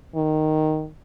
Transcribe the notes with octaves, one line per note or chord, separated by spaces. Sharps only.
D#3